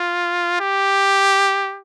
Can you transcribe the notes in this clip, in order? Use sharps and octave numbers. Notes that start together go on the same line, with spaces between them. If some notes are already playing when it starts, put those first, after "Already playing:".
Already playing: F4
G4